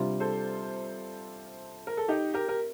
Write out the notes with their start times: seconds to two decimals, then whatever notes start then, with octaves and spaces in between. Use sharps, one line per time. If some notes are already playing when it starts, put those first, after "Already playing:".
Already playing: C3 G3 D4 F4
0.20 A4 C5
1.87 A#4
1.97 A4
2.08 D#4 G4
2.34 G4 A#4
2.49 A#4